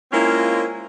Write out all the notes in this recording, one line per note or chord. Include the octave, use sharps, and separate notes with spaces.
G#3 A#3 C4 C#4 E4 F4